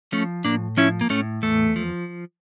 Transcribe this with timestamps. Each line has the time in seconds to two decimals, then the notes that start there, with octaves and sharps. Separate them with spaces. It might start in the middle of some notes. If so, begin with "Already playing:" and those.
0.12 F3 A3 C#4
0.45 A2 A#3 D4
0.77 F3 C#4 E4
1.01 A#3
1.10 A2 A3 C#4
1.42 E2 A3
1.76 F3